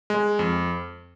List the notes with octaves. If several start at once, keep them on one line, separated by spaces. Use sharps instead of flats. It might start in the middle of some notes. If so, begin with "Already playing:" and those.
G#3
F2